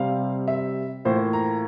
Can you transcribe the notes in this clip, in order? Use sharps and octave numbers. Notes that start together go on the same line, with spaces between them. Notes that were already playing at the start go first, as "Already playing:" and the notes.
Already playing: C3 G3 C4 F5
E5
A2 E3 A#3 F4 C5
A#5